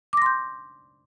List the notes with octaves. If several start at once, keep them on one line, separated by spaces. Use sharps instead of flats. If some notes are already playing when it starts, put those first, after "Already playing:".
C6 D6 G6 A#6